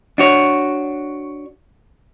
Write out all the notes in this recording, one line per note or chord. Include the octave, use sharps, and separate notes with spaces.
D4 F#4 C#5